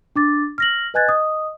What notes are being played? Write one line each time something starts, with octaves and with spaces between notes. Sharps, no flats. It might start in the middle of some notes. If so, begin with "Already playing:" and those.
D4 D6 A6
F6 A#6 F#7
B4 D#5 G#5 F#6 G#6 A6
D#5 D#6